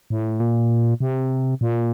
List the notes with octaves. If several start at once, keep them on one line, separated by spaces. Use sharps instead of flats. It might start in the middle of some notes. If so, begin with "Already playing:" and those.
A2
A#2
C3
A#2